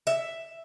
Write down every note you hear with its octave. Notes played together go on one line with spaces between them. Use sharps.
E5